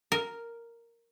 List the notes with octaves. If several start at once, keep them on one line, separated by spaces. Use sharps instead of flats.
A#4